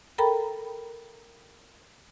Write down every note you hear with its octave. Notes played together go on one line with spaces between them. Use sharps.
A4 A#4 G5 A#5 B5